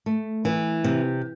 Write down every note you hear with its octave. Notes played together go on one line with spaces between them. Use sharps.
A3
E3
C3